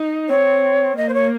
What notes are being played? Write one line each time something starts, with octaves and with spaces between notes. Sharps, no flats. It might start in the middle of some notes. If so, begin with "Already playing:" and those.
Already playing: D#4
C4 C#5
A#3 D#5
C5
C#5